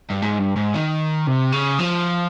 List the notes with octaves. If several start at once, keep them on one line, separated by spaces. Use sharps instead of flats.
G2
G#2
G2
G#2
D#3
C3
C#3
F3